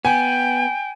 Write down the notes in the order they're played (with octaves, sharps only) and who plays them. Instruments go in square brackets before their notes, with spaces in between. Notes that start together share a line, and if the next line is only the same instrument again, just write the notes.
[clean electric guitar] B3 [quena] G5 [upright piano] G#5